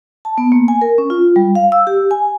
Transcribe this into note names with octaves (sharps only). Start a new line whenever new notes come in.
A5
B3
A#3
G#5
A#4
C#4
F4
G3
F5
E6
G4
G#5